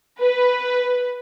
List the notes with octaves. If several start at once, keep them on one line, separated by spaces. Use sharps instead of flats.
B4